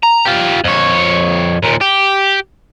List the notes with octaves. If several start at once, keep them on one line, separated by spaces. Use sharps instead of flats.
A#5
F4 G4
F2 C#5
D#2 A#2
G4